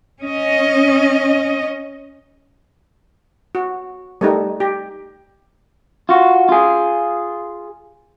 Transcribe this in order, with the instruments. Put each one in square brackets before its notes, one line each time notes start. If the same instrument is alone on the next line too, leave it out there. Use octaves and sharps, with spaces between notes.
[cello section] C#4 D#5
[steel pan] F#4
G3 A3 D#4
G4
[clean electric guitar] F4 F#4
F4 G#4